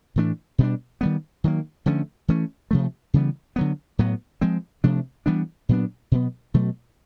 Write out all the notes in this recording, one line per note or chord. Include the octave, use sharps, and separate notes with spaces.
A2 E3 A3 D4
B2 G3 B3 D4
D#3 G3 B3
D#3 F#3 A#3
D3 F3 A3 C#4
E3 A3 C#4
C3 F3 A3
C#3 E3 G3 B3
D3 F#3 B3
A2 F#3 B3
F3 G#3 C4
C3 F3 A3 D4
E3 G3 B3 D4
A#2 F#3 B3 D4
B2 F#3 B3
B2 F#3 A3